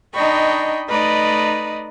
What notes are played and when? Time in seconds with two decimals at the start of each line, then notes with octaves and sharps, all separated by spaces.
0.13 D4 D#4 D#5 G5 B5 C#6
0.89 A3 D#4 B4 D5 D#5